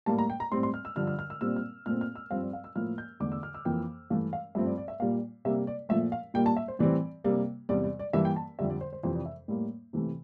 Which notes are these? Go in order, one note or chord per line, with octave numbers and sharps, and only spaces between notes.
A2 G3 A#3 A5
A#5
G5
A#5
A2 G3 C4 C6
C6
F6
E6
G2 D3 F3 F6
F6
F6
E6
A#2 G3 C4 E6
F6
A#2 A3 C4 F6
F6
E6
G2 F3 C4 F5
D5
F5
E6
A2 F3 A#3 F6
G6
E2 D3 A3 D6
E6
F6
E6
F2 E3 A#3 G5
G2 E3 A3 F5
F5
G2 F3 A3 C4 E5
D5
D5
E5
A#2 G3 A#3 F5
C3 G3 A#3 E5
D5
A#2 F3 A3 E5
F5
A#2 G3 A#3 G5
A5
E5
C5
A2 E3 G3 C4 D5
C3 G3 A#3
E2 C3 G3 D5
D5
D5
G2 E3 G3 A#3 E5
G5
A5
F2 D3 G3 E5
D5
C5
C5
F2 C3 E3 C5
D5
E5
A2 G3 A#3
C3 E3 A3